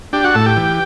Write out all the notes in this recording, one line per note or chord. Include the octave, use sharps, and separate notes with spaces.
D4 G4 G5
F#4 F#5
A2 A4 A5
G4 G5
E3